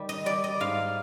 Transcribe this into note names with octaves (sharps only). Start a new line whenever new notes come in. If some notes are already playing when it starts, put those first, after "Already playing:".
Already playing: D#3 G3
D#5
G3 D5
D#5
G#2 F5